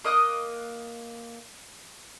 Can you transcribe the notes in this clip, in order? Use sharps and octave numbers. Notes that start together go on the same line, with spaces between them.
A#3 D#5 D#6 F#6